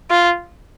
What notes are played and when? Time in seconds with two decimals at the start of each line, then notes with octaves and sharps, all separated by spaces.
0.10 F4